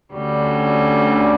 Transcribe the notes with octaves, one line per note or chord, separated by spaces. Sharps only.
D2 D3 G3 C#4 F#4